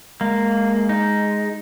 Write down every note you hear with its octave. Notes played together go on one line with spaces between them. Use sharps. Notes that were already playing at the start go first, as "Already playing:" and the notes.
G#3 A#3
D#4